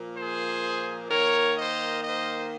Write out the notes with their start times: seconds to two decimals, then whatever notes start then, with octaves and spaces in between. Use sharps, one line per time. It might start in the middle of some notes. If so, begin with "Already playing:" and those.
Already playing: A#2 F3 A#3
0.17 G#4 C5
1.10 D#3 A#3 A#4 C#5
1.57 C5 D#5
2.03 C5 D#5